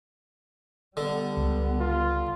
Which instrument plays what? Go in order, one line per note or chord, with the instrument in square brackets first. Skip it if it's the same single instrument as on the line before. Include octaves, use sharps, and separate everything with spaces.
[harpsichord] D3 [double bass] G3 B3
[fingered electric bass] C#2
[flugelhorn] F4